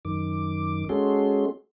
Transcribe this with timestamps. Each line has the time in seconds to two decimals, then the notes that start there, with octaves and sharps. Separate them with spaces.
0.05 F#2 D#3 D6
0.89 G#3 C#4 F#4 G#4 A4 C6